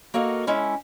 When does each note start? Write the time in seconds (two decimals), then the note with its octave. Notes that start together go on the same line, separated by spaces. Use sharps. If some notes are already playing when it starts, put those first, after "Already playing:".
0.14 A#3 F#4 A4 A#4 D#5
0.47 G#3 C#4 E4 A4